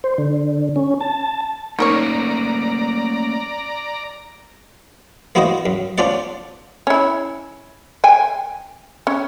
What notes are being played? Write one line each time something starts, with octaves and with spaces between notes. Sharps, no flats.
C5
D3
C#4
A5
A3 A#3 C#4 D#4 A#4 C#5 D5 A#5
A#3 B3 E4 F#4 C5 D#5
F#2
C#4 D4 F4 C5 D5 F#5
C#4 E4
G5 G#5
C#4